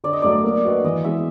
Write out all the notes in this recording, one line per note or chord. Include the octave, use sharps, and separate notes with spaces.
D3 D5
D#5
F#3 A3 D5
A#3
D4 F#4 B4 D#5
E3 D#5
G#3 B3 E4 E5